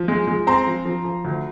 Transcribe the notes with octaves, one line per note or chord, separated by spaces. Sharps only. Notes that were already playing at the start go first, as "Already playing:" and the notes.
Already playing: F3
G#3
G#3
C4 A#5 C6
F3
F3
F3
D2